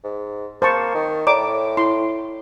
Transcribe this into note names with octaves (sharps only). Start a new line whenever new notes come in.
G#2
A#3 C5 A5 C#6
D#3
A2 C#5 D5 A#5 D6
E4 C6